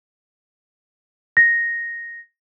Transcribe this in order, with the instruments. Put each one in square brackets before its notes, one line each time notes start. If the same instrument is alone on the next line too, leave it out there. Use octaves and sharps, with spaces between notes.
[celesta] A#6